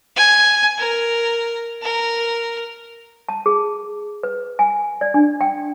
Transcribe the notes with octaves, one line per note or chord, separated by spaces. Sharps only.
G#5
A#4
A#4
A5
G#4
B4
G#5
D5
D4
G5